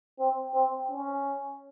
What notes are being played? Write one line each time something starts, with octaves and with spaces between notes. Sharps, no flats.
C4
C4
C#4